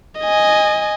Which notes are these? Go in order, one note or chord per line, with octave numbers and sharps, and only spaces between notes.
D#5 G#5